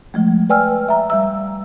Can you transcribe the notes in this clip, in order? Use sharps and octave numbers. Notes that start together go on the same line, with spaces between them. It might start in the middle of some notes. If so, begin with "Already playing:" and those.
F3 G#3 A3
B4 D5 G5 G#5 E6 F6
E5 A#5
G3 E5 E6